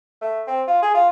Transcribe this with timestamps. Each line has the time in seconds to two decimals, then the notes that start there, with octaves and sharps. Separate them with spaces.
0.22 A3
0.47 C4
0.67 F4
0.82 G#4
0.95 F4